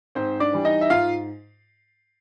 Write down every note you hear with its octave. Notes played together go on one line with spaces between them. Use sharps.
G#2 C4 C5
D4 D5
E3 G3
D#4 D#5
E5
G#2 F4 F5